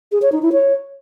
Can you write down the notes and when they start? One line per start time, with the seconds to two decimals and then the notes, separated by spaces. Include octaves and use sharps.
0.12 G#4
0.22 C#5
0.32 D#4
0.42 E4
0.52 C#5